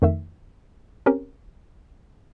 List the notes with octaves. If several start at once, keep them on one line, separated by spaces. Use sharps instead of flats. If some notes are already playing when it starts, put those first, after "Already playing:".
F2 D#3 A3 E5
C4 C#4 G4 A#4